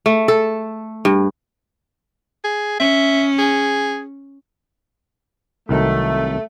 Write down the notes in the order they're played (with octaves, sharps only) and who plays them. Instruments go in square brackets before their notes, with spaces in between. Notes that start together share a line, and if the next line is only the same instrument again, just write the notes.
[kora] A3
A4
G2
[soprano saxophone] G#4
[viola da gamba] C#4 [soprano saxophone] E5
[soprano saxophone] G#4
[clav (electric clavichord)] C2 D#3 F#3 [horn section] A3